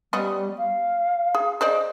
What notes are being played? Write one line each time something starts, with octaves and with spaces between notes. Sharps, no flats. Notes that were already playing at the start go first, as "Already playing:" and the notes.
G3 B3 C#4 D#5
F5
G#4
G#4 C5 D5 D#5